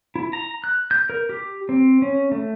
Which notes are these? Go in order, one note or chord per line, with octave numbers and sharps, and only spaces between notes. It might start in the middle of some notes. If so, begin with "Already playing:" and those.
E4
A#5
F#6
G6
A#4
G4
C4
C#4
A3